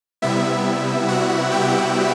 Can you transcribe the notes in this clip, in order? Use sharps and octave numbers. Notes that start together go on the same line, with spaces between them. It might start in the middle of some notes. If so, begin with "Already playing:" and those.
C3 G3 B3 E4 E5
F#4 F#5
G4 G5